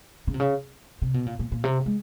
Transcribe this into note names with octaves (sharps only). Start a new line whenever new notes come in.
C#3
C3
C#3
C3
B2
A#2
A#2
A#2
C3
G#3